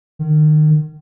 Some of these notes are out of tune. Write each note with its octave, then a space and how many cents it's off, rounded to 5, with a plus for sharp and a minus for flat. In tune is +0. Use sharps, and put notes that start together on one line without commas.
D#3 -30